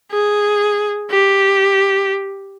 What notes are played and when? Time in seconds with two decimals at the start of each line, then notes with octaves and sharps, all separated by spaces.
0.11 G#4
1.11 G4